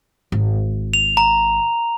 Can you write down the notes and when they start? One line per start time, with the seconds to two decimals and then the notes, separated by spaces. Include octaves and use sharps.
0.32 G#1
0.94 F7
1.17 A#5